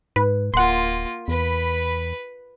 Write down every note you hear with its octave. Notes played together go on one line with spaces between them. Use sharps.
G#2 B4
D1 A#3 F4 F#5 C6
E2 B4 B5